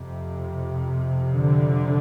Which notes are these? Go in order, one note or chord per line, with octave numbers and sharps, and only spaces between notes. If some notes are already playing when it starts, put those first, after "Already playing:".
Already playing: F2 C3
D3